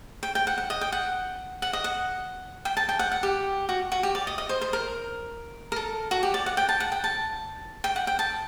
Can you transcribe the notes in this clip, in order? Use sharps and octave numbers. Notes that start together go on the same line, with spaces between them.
G5
G5
F#5
F#5
D#5
G5
F#5
F#5
D#5
F#5
G5
A5
G5
F#5
F#5
G4
F#4
F#4
G4
D5
D#5
D#5
C5
C5
A#4
A#4
A4
F#4
G4
D5
F#5
G5
A5
F#5
G5
A5
G5
F#5
G5
A5